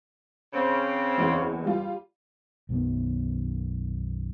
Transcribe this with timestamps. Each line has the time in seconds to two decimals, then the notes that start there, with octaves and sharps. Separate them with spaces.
0.53 C#3 C4
1.18 F#1 E2
1.65 G3 F4
2.69 B1 F#2 D#3 B3